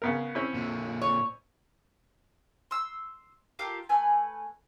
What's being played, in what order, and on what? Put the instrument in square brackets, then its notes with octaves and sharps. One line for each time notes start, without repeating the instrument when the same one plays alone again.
[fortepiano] C#3 B3 A#4
C4 C#4 E4
[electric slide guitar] A#2 D3
[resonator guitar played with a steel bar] C#5
[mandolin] C6 E6
F4 G4 A4 A#4
A3 A4 B4 G#5